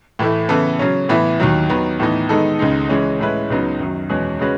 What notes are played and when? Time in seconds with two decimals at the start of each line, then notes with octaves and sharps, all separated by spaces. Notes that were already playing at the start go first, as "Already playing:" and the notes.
0.19 A2 E3 A3 E4
0.49 C#3 E3 B3 E4 A4
0.79 C#3 F#3 C#4
1.09 A2 E3 B3 E4
1.40 D#2 D#3 F#3
1.70 D#3 F#3 B3
2.00 A2 E3 B3 D#4
2.29 D#3 G#3 B3 D#4 A4
2.59 C#2 C#3 G#3 D#4
2.89 C#3 E3 G#3 C#4
3.19 A2 G#3 C#4 E4 B4
3.50 C#2 C#3 F#3 B3 D#4
3.79 F#2 D#3 F#3
4.09 E2 B2 G#3 C#4 G#4
4.39 C#3 G#3 C#4 F#4 B4